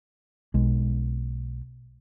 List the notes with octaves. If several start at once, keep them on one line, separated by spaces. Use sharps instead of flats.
B1 G#3